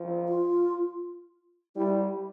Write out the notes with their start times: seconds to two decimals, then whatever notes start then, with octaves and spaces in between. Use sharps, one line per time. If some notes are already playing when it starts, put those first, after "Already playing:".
Already playing: F3
0.29 F4
1.76 G3 E4